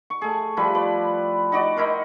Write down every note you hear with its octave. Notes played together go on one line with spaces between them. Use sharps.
C#6
A3 G#4
F3 G3 E4 B4
B4 D5
D#4 F#4 D5 D#5
D#4 E4 A#4 C5